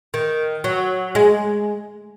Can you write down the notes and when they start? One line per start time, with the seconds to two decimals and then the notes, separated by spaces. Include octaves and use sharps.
0.14 D#3
0.64 F#3
1.15 G#3